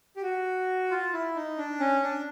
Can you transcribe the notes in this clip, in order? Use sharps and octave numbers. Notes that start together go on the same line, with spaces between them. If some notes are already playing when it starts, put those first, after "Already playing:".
G4
F#4
F4
E4
D#4
D4
C#4
D4